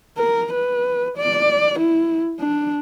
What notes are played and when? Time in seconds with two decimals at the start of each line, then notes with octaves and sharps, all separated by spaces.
0.18 A#4
0.53 B4
1.18 D5
1.79 E4
2.40 D4